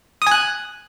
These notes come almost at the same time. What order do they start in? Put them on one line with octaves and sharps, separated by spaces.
D#6 G#5 F#6